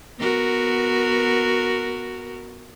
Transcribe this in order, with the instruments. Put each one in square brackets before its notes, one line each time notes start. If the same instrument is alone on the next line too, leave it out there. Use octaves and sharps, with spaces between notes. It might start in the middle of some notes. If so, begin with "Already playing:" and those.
[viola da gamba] B3 F#4 A#4